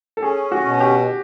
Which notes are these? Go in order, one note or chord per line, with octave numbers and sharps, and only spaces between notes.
A4
C#4 G#4
F#4
B2
G4